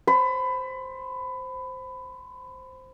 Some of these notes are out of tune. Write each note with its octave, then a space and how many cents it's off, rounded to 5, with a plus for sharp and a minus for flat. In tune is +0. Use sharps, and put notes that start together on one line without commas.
C5 +0 B5 +20